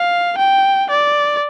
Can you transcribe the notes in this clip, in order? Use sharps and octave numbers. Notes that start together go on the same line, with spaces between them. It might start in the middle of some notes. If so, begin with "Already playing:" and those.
Already playing: F5
G5
D5